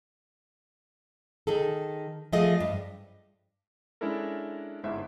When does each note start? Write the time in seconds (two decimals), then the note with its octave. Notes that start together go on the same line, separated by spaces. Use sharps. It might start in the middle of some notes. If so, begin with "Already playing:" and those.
1.47 D#3 G#4 A4
2.33 F3 A3 F4 G#4 D#5
2.60 G2
4.01 G#3 C#4 D4 E4 A4 A#4
4.84 G1 G#2 E4 C5 E5